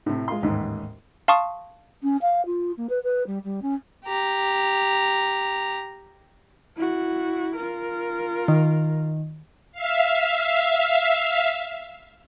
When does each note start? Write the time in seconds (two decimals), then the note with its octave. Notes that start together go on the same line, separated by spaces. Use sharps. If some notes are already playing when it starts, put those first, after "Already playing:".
0.06 A2 C3
0.28 G#3 F4 C6
0.42 A1 D#2 G#2
1.28 F5 A5 C6 C#6 D#6
2.02 C#4
2.21 F5
2.45 F4
2.77 A#3
2.89 B4
3.03 B4
3.26 G3
3.43 G3
3.62 C#4
4.05 G4 A#5
6.76 E4 F#4
7.56 F4 A#4
8.48 D#3
9.72 E5 F5